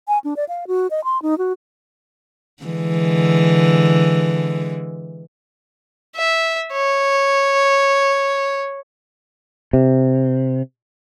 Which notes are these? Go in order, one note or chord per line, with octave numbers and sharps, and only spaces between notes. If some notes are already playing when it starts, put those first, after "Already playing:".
G#5
D4
D5
F5
F#4
D#5
C6
D#4
F#4
D3 E3 G#3
E5
C#5
C3